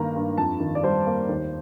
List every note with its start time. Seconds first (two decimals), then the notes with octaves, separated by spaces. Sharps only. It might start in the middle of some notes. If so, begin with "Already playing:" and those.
Already playing: G2 D#3 A#3 A#5
0.16 G2
0.38 F2 A5
0.60 D#3
0.75 D5
0.83 G3 C5
1.07 A#3
1.29 D#2